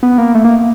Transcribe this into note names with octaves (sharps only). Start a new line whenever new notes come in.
B3
A#3
A3
A#3